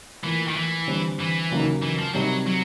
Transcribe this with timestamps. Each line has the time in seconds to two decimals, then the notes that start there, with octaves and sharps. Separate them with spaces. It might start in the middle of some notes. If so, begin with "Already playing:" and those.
0.24 A2 E3 F3 A#3
0.47 D#3
0.56 E3
0.88 D3 G3 C4
1.19 E3
1.51 D#2 C#3 F#3 A#3 D#4
1.83 E3
1.99 F3
2.14 C3 D#3 F#3 G3
2.47 F#3